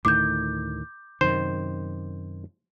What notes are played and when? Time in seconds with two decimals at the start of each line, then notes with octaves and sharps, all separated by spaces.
0.05 D2 A2 D#3 D6 G6
1.21 F#2 C3 D#3 C5